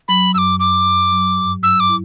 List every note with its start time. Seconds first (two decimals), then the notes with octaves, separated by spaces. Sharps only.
0.08 F#3 B5
0.34 F#2 D6 E6
0.59 F#2 D6
0.86 F#2
1.12 F#3
1.37 G2
1.63 F#3 E6
1.80 D6
1.89 E4